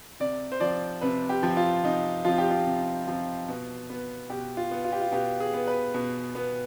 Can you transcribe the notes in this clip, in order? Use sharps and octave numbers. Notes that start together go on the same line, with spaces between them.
C3 D5
C5
F3 C4 D5
C3 B4
G4
F3 C4
F4
C3 D#4
F3 C4 F4
G4
F4
C3
F3 C4
B2
B3
B2 G4
F4
B3
F4
G4
F4
B2 G4
G#4
B3
B4
B2
B3